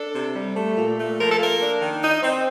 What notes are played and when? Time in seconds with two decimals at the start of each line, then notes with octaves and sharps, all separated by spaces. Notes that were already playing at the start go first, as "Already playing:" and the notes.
Already playing: D4 A4
0.14 C3
0.35 G3
0.55 A3
0.76 A#2
0.98 A3
1.18 F3 A#4
1.29 A4
1.39 A#3 A#4
1.60 D4
1.80 D#3
2.01 D#4
2.22 C4